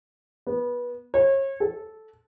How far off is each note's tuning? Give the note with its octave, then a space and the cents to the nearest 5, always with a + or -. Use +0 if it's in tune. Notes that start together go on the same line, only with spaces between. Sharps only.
B3 -20
C#5 -35
A4 -10